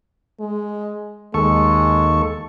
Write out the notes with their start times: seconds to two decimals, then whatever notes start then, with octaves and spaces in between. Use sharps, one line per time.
0.40 G#3
1.34 D#2 G#3 A4 C#6